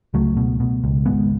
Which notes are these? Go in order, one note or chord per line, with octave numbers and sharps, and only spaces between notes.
C#2 F#3 A3
B2
B2
C#2
G#1 G#3 B3